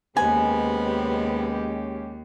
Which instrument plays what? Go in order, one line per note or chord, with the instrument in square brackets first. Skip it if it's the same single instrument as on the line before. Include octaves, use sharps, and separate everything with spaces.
[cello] D#2 [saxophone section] C3 B3 [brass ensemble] G#3 C#4 G4 [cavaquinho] G#5